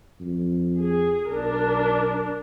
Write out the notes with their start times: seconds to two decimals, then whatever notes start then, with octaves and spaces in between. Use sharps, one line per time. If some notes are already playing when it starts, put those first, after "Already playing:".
0.20 F2
0.80 G#4
1.28 B1 D4 A#4